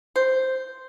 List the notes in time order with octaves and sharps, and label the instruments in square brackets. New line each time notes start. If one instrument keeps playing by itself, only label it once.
[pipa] C5